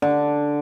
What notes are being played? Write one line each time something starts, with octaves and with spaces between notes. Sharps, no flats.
D3